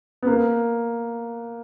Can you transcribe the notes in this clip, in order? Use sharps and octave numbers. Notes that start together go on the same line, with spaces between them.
B3
A#3